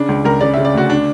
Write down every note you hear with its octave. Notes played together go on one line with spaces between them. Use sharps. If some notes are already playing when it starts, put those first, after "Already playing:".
Already playing: C#3 D4
C#2
C#2 A#4
C#3 D5
E5
C#3
D5
D2 F#4
D4